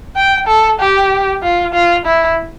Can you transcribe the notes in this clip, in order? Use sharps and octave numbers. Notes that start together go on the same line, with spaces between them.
G5
A4
G4
F4
F4
E4